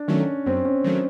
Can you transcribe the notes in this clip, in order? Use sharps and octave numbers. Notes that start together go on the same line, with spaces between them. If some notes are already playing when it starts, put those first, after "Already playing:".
Already playing: D4
D#3 F#3 A3 C#4
F#2 C4
C#4
D#3 F#3 A3